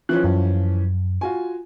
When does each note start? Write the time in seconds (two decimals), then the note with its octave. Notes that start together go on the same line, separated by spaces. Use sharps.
0.09 E3 F3 C#4 F#6
0.24 F#2
1.21 F4 F#4 G#5